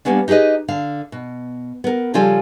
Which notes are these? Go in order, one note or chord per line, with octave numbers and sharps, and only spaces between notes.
G3 A#3 B3 C#4 D4
D#4 G4 G#4 B4 D#5
D3 F5
B2
B3 A#4
C#3 F3 G3 F4 A4 G#5